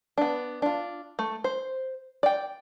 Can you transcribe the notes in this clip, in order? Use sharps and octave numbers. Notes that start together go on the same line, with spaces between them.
B3 D4
D4 F4
A3
C5
D5 G5